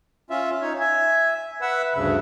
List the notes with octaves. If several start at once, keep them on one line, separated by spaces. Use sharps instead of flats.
C#4 F4 E5
D#4 C#5
E5 G#5
B4 E5 F#5 E6
D2 G2 C#3 E5